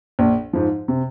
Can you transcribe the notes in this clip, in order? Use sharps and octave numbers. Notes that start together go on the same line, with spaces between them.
A#1
G#2 F3
C3